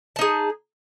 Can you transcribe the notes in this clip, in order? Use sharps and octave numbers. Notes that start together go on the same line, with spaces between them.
D#4 G#4 A5